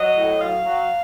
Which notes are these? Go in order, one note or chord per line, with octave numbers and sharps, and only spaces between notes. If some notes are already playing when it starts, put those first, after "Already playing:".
Already playing: F#3 D#5
A2
F#3 F5
F#3